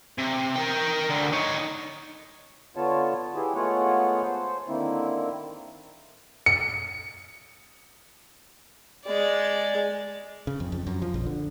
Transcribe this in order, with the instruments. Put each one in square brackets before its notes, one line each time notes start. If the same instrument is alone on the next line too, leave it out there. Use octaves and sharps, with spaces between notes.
[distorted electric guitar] C3
A#4 G5
D2 D3
D#4 C#5
[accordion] D3 B3 F4 C#5 A5
B3 E4 G4 G#4
G#3 A3 B3 F4 C#5 F#5
C5
D3 D#3 A#3 C4 E4
[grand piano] C#7
[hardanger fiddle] G#3 D5
[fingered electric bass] C#3
F2
F2
F#2
F3
A#1
D3